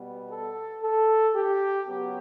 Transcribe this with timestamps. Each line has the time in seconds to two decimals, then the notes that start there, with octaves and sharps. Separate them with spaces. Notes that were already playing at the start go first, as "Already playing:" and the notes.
Already playing: B2 G3 B3
0.30 A4
0.82 A4
1.35 G4
1.87 C#3 F#3 B3 G4